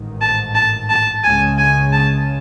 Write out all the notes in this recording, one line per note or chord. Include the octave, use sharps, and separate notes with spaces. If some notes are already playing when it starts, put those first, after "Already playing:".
Already playing: A1 G#2 D#3
A5
A5
A5
C#2 C#3 G#3 C#4 G#5
G#5
A5